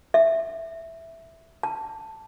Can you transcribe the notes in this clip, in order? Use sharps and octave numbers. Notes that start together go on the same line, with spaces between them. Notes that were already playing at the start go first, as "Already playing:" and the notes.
E5
A5